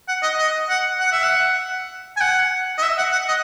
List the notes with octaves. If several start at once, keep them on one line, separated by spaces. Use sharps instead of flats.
F#5
D#5
D#5
F#5
F#5
E5
F#5
G#5
F#5
D#5
E5
F#5
F#5
D#5